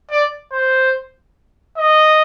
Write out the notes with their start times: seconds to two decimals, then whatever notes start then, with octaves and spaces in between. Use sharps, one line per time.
0.11 D5
0.52 C5
1.77 D#5